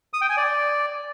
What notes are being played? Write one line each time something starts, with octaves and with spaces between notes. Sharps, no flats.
D#6
G5
G#5
D5